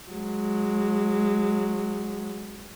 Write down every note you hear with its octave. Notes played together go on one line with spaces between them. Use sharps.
F#3 G#3